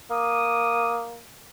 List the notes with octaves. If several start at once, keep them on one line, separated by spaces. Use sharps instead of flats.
A#3 D6 D#6